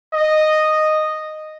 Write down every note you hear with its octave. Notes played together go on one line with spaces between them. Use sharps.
D#5